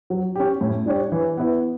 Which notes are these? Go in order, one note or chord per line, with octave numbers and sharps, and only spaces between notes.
F#3
C#4 G4
A2
G3 D4 G4 C#5
E3
B3 E4 B4